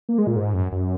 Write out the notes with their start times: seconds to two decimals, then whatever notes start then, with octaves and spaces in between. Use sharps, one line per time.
0.09 A#3
0.18 G#3
0.27 A#2
0.36 G#2
0.54 F#2
0.72 F#2